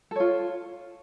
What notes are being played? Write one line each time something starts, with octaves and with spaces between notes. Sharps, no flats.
F4 A4 C#5